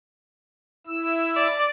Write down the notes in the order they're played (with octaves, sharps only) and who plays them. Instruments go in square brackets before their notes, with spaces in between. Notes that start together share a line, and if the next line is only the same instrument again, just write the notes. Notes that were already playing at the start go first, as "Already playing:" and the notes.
[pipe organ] E4 E6
[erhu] D5